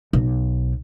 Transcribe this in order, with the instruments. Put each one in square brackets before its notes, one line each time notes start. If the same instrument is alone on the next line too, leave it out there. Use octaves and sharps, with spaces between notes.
[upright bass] B1